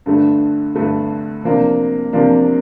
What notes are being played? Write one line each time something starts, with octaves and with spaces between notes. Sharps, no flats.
G2 D3 A3
G2 D3 A3
C3 F3 A#3 D4
C3 F3 A#3 D4